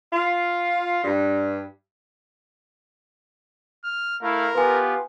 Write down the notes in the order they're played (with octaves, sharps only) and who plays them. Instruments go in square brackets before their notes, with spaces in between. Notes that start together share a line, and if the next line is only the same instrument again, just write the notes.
[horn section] F4
G2
[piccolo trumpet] F6
[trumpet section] A3 E4 F5 [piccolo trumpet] A#4
[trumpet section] B3 F4 G4 [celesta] B4 G#5